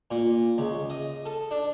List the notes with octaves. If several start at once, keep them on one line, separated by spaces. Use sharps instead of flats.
A#2
C#2
D#5
A4
D4